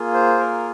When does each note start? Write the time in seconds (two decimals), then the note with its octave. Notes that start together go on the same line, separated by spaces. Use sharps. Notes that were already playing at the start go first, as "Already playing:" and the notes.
Already playing: A#3 F4 G#4
0.14 C5
0.39 A#4